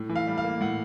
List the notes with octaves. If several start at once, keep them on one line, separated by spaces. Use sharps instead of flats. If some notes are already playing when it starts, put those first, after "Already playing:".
Already playing: A2
E3
F5
G3
F5
A#3
A2 F#5